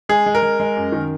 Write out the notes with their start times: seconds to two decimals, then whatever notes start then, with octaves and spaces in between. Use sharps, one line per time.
0.09 G#3 G#4
0.26 G#3
0.35 A#4
0.42 G#3
0.60 G#3
0.76 F#2
0.92 D#3